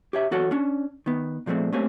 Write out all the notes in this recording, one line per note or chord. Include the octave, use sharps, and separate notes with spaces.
G4 C#5 E5
E2 F#4 A4 C#5
C#4 D4
D#3 B3
A#2 F3 G#3 A3 C4
A3 A#3 C4 C#4 G4 C#5